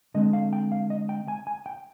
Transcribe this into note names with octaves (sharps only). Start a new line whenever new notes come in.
D3 G#3 C4 D#5
F5
G5
F5
D#5
G5
G#5
G#5
G5